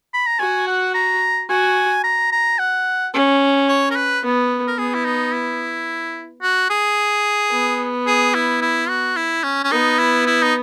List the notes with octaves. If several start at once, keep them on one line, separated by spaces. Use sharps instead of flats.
B5
A#5
F#4 G#5
F#5
A#5
F#4 G#5
A#5
A#5
F#5
C#4
C#5
A#4
B4
B3
A#4
B3 G#4
E4
D#4
E4
F#4
G#4
B3
G#4
E4
E4
F#4
E4
C#4
C#4
B3 D#4
E4
E4
D#4